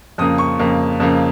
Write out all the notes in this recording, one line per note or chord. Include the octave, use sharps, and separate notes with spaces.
F2 C#3 A#3 D#6
C#6
F2 C#3 A#3
F2 C#3 A#3